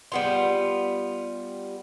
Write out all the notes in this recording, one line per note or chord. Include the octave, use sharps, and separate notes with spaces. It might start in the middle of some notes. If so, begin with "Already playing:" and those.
G3 B3 F4